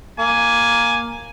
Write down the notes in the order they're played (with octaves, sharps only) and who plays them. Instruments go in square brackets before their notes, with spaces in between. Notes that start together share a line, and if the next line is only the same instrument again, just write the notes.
[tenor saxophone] A#3 [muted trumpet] G#5